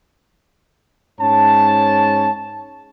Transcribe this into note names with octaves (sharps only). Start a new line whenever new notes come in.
G#2 C#4 C#5 A5